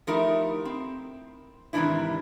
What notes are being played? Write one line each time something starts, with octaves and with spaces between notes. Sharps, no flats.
F3 A3 D#4 E4 G4 A#4
C4
G#2 C3 D#3 E3 D4 E4